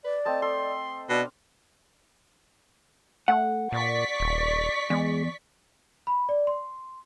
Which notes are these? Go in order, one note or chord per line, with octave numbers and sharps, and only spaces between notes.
B4 D5
A3 C4 D#5 A5
A4 C6
B2 D4 C5 D5 F5
A3 F#5
A#2 D5 C#6 B6
D#1
E2 G#3
B5
D5
C6